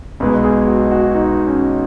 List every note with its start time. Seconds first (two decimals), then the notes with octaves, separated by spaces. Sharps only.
0.20 B1 B2 G#3 B4
0.44 G#4
0.67 F#4
0.91 F#4
1.15 D#4
1.47 C#4